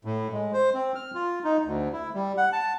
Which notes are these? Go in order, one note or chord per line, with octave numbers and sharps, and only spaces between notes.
A2
G#3
C5
C4
F6
F4
D#4
D2
E4
G3
F#5
A5